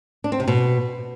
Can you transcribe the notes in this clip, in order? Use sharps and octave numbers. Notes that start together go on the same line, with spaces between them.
D4
C4
C3
B2